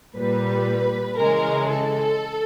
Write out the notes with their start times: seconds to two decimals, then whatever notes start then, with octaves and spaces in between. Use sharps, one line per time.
0.16 A#2 G3 B4
1.17 C#3 E3 G#3 A#4
1.69 A4